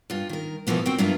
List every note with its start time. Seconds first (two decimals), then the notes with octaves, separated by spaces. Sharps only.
0.10 G2 F4
0.29 D#3 A#4
0.67 B2 E3 F3 A#3 B3
0.86 C4 F#4 G5
0.98 G2 F#3 A#3 B3 E4 F4